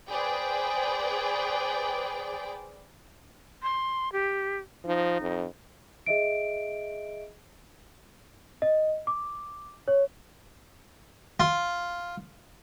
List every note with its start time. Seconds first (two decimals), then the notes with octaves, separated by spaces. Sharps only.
0.10 G#4 B4 C5 D5 G5
3.63 C6
4.12 G4
4.85 F3 D#4
5.21 F2
6.06 G#4 D#5 E5 D7
8.62 D#5
9.07 D6
9.88 C#5
11.40 F4